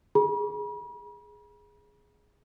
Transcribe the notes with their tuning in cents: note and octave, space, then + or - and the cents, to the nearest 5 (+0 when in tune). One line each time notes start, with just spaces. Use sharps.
G#4 +0 B5 -45